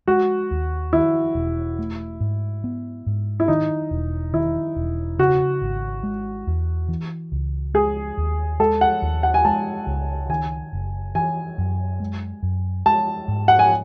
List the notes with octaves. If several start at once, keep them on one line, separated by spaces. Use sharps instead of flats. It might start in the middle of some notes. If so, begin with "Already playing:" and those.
G#3 F#4
D#2
D#3 E4
E1
A3
G#2
B3
G#2
E4
D#3 D#4
E1
D#3 E4
E1
C#3 F#4
G#1
G#3
E2
E3
C#2
G#3 G#4
D#2
G#3 A4
F#5
D#2
F#5
G#5
G#3 A5
C#2
D#3 G#5
F#1
E3 G#5
F#2
G#3
F#2
G#3 A5
G#2
F#5
G#5